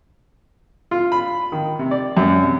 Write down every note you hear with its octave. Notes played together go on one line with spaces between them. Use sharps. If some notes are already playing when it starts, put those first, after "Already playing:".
F4
B5
D#3
C3
D5
F#2
C3